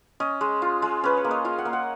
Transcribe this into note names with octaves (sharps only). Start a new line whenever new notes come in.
C#4 D#5
G#3
F4
G#3
C#4 B4
C#5
A#3
D#5
F4 F5
F#5
A#3
F#5